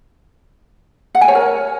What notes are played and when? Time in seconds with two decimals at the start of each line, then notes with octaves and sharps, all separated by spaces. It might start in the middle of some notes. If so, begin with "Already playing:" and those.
1.15 F#5
1.21 G#5
1.28 C#5
1.35 A#4